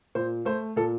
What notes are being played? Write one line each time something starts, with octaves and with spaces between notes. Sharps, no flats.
A#2 C5
A3 C5
A#2 A4